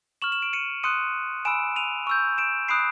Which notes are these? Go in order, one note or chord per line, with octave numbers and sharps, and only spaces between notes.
C#6 F6 E7 F#7
E7 F#7
D7 E7
C#7 D#7
C6 D#6 F#6 C#7 D#7
G#5 B5 E6 D7 E7
D#7 F7
C#6 E6 G6
D7 E7
B5 D#6 F#6 C7 D7